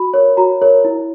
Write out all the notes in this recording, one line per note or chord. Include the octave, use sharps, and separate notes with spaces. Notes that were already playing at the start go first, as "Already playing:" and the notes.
Already playing: F#4 B5
A#4 C#5
F#4 A#5
A#4 C#5
E4